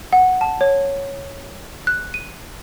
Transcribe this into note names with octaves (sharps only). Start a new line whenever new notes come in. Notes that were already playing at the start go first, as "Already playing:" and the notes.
F#5
A5
C#5
F#6
D#7